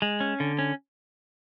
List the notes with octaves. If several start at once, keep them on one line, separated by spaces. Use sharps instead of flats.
G#3
C#4
D3
C#4